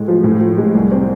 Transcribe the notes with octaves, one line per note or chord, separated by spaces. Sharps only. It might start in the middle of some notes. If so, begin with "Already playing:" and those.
Already playing: A2 G#3
F3
A2
F3
G#3
C2
C4